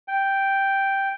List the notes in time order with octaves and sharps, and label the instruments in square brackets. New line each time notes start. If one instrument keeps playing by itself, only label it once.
[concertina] G5